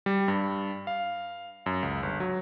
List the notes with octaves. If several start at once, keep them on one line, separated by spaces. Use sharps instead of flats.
G3
G2
F5
F#2
C#2
G1
F#3